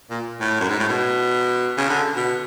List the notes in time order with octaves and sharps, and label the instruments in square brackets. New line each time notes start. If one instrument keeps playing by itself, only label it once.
[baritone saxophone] A#2
A2
F#2
G#2
A2
B2
C#3
D3
B2